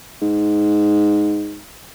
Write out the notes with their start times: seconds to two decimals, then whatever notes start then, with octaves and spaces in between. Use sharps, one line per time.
0.22 G#2